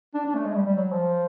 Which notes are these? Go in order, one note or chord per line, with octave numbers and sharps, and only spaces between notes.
D4
D4
A3
G#3
G3
G3
F#3
F3